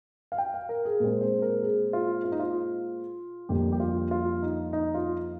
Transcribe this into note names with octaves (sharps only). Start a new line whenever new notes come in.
F5
G5
F5
A#4
G#4
A#2 G#3 C4 A#4
C5
A#4
G#4
F4
F4
D#4
F4
F2 D3 G3 A#3 G4
G4
F4
F4
D#4
D#4
F4